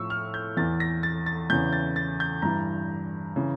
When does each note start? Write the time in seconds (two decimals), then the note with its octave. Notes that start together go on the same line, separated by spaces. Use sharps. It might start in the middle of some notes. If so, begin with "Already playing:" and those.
Already playing: A2 F3 C#6 E6
0.10 F6
0.34 G6
0.57 E2 E3 A6
0.80 A#6
1.03 A6
1.26 A6
1.50 E2 C#3 E3 G6
1.73 A6
1.96 A6
2.20 G6
2.42 G2 E3 A#5
3.36 C#3 E3